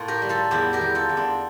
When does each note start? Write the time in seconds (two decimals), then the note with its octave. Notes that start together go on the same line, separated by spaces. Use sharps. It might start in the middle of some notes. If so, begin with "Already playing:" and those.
Already playing: A2 A#3 F4
0.08 G4 A#4
0.22 G3
0.29 F4 A4
0.51 E2 E4 G4
0.73 G4 A#4
0.81 E2
0.95 F4 A4
1.09 E2
1.17 D4 F4